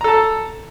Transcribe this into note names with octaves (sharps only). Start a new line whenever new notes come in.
A4 A5 A#5